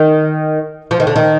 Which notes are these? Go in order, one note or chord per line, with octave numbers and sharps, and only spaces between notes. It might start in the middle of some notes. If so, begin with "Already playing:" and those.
Already playing: D#3
F3
D#3
D3
D#3